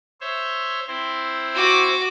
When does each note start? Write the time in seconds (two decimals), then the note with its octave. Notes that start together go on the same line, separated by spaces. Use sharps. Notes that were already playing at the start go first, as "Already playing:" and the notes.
0.21 C5 C#5 E5
0.88 C4 E4 C5
1.55 F#4 D6